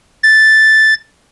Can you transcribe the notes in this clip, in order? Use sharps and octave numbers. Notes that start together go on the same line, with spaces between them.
A6